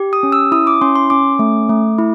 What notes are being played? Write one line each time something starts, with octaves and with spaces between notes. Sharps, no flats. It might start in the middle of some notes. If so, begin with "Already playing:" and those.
Already playing: G4
D#6
C#4
E6
E4 D#6
D6
C#4 C6
C6
C#4 D6
A3
A3
E4